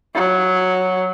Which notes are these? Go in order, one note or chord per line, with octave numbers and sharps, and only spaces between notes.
F#3